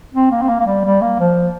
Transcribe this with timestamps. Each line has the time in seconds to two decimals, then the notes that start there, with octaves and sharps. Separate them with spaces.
0.14 C4
0.31 A#3
0.42 C4
0.49 A#3
0.60 A#3
0.66 G3
0.85 G3
1.02 A#3
1.19 F3